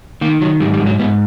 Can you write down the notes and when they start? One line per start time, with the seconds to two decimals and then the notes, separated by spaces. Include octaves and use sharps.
0.21 D#3 A#3
0.41 D#3 F#3
0.60 G#2 G3
0.74 G3
0.79 G#2
0.86 F#3
0.99 G#2 B3